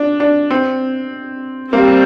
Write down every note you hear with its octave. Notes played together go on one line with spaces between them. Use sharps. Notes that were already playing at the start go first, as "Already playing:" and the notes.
Already playing: D4
D4
C4
G3 A#3 C4